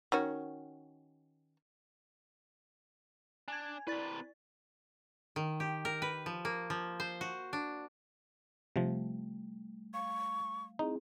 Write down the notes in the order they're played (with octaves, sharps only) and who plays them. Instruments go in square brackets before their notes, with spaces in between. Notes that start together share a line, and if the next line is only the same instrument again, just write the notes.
[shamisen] D#3 C#4 F#4
[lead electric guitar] D4 [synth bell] G#5 G#6
[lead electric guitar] C3 B4 [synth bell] E4 D5 A6
[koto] D#3
G4
A#4
B4
F3
A#3
F3
C5
F#4
D4
[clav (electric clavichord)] C3 F3 [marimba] G3 A3
[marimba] F5 [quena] C#6
[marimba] C4 E4 G#4 [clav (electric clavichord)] D#4